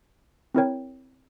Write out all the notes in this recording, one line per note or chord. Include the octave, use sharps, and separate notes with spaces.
C4 E4 A#4 C#5 G5